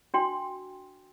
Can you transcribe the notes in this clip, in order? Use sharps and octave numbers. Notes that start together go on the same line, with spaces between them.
D4 F#4 G5 C6